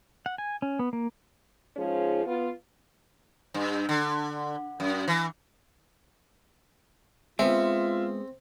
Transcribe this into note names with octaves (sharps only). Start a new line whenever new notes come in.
F#5
G#5
C#4
B3
A#3
G#2 F3 G#3 C#4 F4 G#4
B3 F4
G2
D3
F#2
E3
G#3 B3 C4 F4 E5